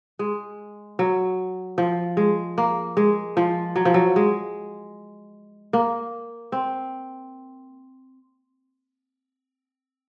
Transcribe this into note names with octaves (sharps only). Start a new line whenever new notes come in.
G#3
F#3
F3
G#3
A#3
G#3
F3
F#3
F3
F#3
G#3
A#3
C4